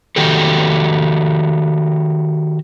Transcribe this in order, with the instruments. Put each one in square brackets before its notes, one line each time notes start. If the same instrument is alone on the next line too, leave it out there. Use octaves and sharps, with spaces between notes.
[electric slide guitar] D#3 F#4 G4 A4